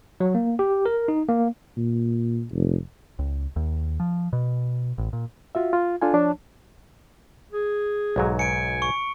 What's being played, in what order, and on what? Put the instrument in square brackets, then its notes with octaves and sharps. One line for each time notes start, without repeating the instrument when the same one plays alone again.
[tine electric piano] F#3
A#3
G4
A#4
D#4
A#3
[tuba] A#2
F1
[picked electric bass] C#2
D#2
F3
B2
A1
A#2
[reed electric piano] F4 F#4 E5
F4
D4 F4 A4 G#5
F3 D4 C#5 A5
[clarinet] G#4
[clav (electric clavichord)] B1 G#2 F#3
[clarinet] G#5 [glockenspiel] C#7 D7
[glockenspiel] C#6